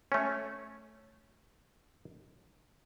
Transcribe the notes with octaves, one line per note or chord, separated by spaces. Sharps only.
A3 C#4